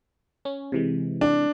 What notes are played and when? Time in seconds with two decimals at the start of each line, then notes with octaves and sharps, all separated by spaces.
0.45 C#4
0.72 C3 E3 G#3
1.21 D4